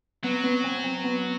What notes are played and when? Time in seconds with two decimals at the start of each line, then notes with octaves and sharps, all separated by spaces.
0.24 F#3 B3
0.44 B3
0.64 C4
0.84 C4
1.04 B3